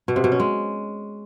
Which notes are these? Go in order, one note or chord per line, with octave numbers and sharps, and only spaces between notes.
B2
C3
B2
C#4
G#3